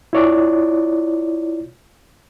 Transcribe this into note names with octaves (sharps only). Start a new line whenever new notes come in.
E4 F4 C#5 D5